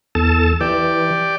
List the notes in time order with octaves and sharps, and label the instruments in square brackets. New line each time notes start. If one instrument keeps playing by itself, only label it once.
[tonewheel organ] E2 A4 A5
[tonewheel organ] E3 [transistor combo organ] G4 D5